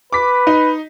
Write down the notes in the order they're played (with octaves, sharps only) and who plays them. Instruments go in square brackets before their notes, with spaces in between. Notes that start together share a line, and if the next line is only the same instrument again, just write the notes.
[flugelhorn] B4 [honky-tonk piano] D6 B6
[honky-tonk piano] D#4